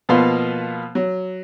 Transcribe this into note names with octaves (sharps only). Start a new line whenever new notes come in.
B2 F3 A#3 B3 F5 C6
F#3